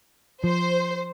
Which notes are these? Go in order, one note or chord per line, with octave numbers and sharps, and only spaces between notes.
F3 C5